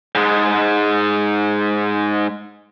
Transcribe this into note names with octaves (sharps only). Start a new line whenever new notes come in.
G#2 G#3